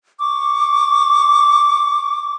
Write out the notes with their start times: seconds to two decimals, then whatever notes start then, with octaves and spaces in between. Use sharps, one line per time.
0.19 C#6 D6